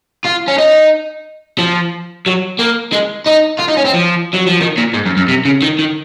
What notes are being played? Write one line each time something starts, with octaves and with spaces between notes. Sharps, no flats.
F4
C#4
D#4
F3
F#3
A#3
G#3
D#4
F4
D#4
C#4
C4
F3
F#3
F3
D#3
A#2
G#2
F#2
F#2
C3
C#3
D#3
D#3